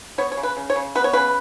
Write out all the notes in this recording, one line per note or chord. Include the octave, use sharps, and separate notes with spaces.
B3 C#5
C#5
C#3
B4
C#3
C#5
C#3
B3 B4
C#5
C#3 B4